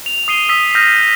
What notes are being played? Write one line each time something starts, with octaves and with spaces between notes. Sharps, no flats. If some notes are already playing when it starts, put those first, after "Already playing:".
F7
D#6 C7 D#7 G7
D#6 E6 B6
F6 G6 A#6 D#7